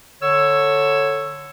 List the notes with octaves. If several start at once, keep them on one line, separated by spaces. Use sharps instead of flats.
D3 C#5 E6